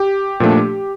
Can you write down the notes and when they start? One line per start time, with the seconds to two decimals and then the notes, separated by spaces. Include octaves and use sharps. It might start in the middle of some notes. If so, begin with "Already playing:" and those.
Already playing: G4
0.40 A#2 F3 A3 D4